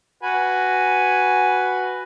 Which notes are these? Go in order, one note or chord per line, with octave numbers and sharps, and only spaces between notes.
F#4 B4 G#5